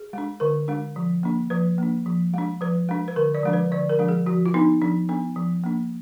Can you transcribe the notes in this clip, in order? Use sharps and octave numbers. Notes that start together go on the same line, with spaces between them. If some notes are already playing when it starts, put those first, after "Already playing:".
Already playing: G#4
G#3 D4
D3 A#4
G#3 D4
F3
A#3 D4
F3 B4
A#3 D4
F3
G#3 D4
F3 B4
G#3 D4
B4
D3 A#4
D5
F3 G#3 D4
B4
D3 D5
A#4
F3 G#3 D4
G#4
F3 F#4
F4
B3 D4 D#4
F3 D4
B3 D4
F3
A#3 D4